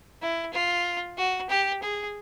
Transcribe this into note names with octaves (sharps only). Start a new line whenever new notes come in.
E4
F4
F#4
G4
G#4